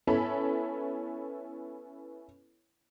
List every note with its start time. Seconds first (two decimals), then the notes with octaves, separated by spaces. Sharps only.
0.07 B3 C#4 E4 A4 C#5 B5